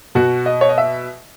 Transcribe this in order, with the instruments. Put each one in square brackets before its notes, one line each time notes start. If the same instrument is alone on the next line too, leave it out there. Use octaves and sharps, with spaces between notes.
[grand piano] B2 F#4
D#5
C#5
D#5
E5